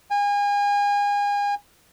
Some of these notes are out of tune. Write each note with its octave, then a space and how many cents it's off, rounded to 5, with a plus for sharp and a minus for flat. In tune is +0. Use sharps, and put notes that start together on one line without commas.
G#5 -35